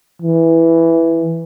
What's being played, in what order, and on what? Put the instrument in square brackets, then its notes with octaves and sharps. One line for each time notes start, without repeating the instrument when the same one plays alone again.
[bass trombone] E3